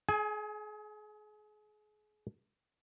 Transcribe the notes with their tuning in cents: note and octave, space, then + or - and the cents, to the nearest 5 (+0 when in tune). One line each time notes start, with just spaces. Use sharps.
G#4 +35 G#5 +0